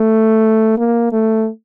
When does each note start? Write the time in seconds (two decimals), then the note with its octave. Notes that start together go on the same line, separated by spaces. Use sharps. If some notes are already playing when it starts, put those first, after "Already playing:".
Already playing: A3
0.77 A#3
1.12 A3